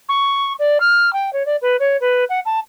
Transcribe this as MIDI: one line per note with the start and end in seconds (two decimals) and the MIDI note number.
0.09 0.53 85
0.59 0.78 74
0.80 1.13 89
1.13 1.33 79
1.33 1.46 73
1.46 1.56 74
1.62 1.77 71
1.80 1.97 73
2.01 2.25 71
2.29 2.40 78
2.46 2.60 81